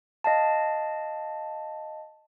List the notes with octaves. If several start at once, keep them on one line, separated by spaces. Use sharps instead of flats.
D#5 F5 A5